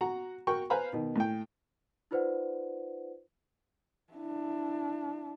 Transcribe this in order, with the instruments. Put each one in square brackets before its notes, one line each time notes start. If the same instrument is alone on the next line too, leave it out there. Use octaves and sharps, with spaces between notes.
[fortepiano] F#4 F#5 A#5
F#4 A#4 G5 C#6
B4 C5 F5 G#5 A#5 B5
B2 D#3
A2 G5
[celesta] D#4 F4 B4 C5 D5 F#5
[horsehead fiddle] D4 E4